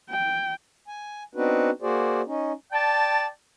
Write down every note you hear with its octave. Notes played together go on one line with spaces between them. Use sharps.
G5
G#5
B3 C4 D4 D#4 F#4 B4
A#3 F#4 G#4 C5 D5
C#4 D#4
D5 G5 A5